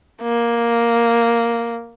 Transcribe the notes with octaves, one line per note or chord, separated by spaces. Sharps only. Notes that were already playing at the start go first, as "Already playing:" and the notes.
A#3